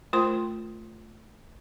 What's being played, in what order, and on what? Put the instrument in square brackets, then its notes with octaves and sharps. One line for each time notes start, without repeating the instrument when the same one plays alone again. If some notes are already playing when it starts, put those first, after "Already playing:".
[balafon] A3 F4 A#4 C5 C6